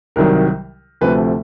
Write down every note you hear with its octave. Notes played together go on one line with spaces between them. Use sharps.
C2 C3 D#3 F#3 A#4
D2 C3 F3 A3 B4